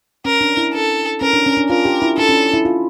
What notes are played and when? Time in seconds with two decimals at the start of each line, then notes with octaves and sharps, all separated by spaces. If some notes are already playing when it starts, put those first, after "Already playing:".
0.25 C#4 A#4
0.41 D4
0.57 E4
0.74 A4
1.21 C#4 A#4
1.34 D4
1.46 C#4
1.57 D4
1.70 F4 A#4
1.85 G4
2.02 E4
2.18 D4 A4
2.29 C#4
2.53 E4
2.65 F4